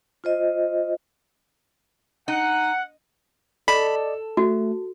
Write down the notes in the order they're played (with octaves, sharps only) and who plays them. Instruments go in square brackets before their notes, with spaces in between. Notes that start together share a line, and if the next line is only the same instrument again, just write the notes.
[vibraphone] F4 C5 D#5
[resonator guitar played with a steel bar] D#4 [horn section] F#5
[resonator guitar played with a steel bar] A4 [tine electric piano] D5 D#5 [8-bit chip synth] B5
[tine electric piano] A3 [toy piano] F#4